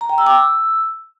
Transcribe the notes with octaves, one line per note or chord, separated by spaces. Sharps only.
A#5
G5
E6
D6
E6